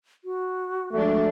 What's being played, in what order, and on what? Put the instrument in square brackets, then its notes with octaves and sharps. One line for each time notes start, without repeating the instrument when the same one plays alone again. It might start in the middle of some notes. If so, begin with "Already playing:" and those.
[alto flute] F#4
[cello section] F3 G#3 D4 [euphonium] A3